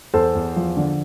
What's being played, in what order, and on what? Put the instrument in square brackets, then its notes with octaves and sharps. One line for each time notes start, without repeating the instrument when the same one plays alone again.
[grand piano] E2 A4 C5
E2
F3
D3